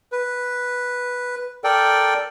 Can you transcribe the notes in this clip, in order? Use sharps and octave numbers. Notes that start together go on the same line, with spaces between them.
B4
A4 A#4 D5 G5